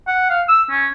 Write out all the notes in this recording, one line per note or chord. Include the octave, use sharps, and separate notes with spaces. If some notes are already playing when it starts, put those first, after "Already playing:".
F#5
F5
E6
C#4